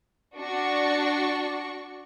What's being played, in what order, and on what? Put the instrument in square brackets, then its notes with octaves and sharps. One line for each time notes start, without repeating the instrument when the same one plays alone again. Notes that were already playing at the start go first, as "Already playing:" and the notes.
[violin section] D4 F#4 C#6